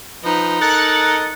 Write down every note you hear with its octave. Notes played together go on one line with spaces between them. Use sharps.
F3 D#4 B4
A4 A#4 D#5 F#6 A6 C#7